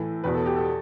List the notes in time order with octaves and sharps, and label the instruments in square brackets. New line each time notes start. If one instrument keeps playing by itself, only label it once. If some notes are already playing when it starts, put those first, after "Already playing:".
Already playing: [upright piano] A2 E3 A4
E2 B2 B4
A4
G4
A4